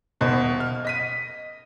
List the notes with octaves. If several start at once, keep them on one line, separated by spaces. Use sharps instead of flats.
D#1 B2 D#4 C5
F6
D#5 B6 D#7